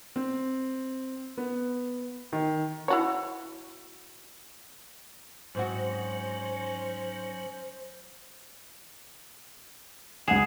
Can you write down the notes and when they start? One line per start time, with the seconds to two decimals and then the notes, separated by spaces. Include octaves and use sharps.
0.16 C4
1.37 B3
2.33 D#3
2.88 E4 F#4 C#5
5.55 G#2 F#3 C4 C#4 F#4 C5
10.28 C#2 G#4 F#5 E7